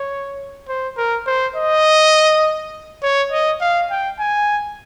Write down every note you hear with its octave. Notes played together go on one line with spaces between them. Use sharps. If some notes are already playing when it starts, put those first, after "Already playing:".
Already playing: C#5
C5
A#4
C5
D#5
C#5
D#5
F5
G5
G#5